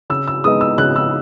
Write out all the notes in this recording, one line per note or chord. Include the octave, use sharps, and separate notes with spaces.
C#3 E6
E6
G#3 B3 D#4 D#6
E6
C#3 F#6
E6